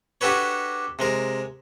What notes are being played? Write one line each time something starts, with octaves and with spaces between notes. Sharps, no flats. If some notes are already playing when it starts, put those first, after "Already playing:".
D4 F#4 G4 A4 B4 C#5
C3 G#3 A#4